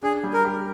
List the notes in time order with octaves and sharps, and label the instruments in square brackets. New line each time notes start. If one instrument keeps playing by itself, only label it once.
[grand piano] D4 [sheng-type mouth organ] G#4
[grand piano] G3
[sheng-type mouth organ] A#4
[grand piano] G4